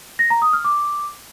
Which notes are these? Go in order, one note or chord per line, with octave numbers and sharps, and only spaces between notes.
A#6
A#5
D#6
F6
D6